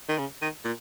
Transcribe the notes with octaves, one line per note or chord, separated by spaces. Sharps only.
D#3
C#3
D#3
A#2